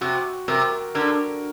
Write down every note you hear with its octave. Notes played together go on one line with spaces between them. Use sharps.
C3 F#4
C3 A#4
D3 A#4